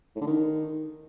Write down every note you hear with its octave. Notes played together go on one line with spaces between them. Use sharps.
A2
D3
D#3